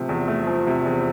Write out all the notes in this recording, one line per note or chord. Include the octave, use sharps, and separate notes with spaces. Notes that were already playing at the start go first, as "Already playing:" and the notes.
Already playing: C3 F3 A3
E2
A3
F3
C3
E2